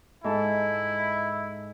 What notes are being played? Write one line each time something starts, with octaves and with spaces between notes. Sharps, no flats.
G#2 E4 A4